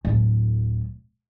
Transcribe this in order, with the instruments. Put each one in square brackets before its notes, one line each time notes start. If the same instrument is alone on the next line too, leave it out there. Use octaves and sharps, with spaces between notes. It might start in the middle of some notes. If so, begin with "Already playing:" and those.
[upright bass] D1 A2